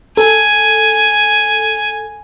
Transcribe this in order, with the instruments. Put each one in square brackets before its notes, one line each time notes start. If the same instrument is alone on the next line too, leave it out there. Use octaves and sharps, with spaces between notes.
[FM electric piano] A4 [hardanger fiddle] G#5